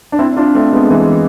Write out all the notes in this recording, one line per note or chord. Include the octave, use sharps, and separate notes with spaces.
D4
C4 E4
D4 F4
A3 C4
G#3 B3
E3 G#3